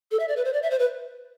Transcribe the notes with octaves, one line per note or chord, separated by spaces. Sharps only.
A4
E5
D5
B4
C5
D5
E5
C5
B4